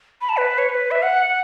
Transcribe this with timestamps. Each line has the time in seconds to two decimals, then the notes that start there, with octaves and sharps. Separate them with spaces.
0.21 B5
0.29 A5
0.37 B4
0.58 C#5
0.69 B4
0.91 E5
1.03 F#5